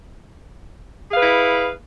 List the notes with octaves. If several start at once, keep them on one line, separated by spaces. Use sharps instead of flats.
E4 G#4 B4 F5